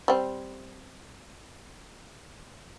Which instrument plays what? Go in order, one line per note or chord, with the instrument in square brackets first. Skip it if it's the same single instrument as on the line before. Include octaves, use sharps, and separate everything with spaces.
[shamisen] G3 C4